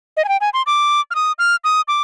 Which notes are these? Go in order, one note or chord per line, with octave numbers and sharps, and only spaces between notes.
D#5
G#5
G5
G#5
C6
D6
F6
D#6
F6
D#6
D6